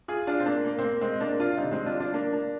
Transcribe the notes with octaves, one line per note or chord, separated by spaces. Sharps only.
F4 G#4
D4 F4
C4
A#3 D4
A#3
C4
A#3
G#3 C4
A#3 D4
D4 F4
D3 G3 C4 D#4
G#3 C4
D4 F4
D4 F4
A#3 D4
A#3 D4